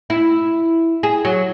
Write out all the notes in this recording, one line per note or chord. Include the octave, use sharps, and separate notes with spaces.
E4
G#4
F#3